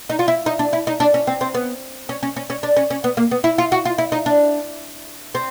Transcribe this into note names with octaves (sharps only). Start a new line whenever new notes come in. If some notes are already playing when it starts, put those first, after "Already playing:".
D#4
F4
E4
D#4
D4
E4
D#4
D4
C#4
C4
C4
B3
C#4
C#4
C#4
C#4
D4
C#4
C#4
B3
A#3
B3
E4
F4
F#4
F4
E4
D#4
D4
C4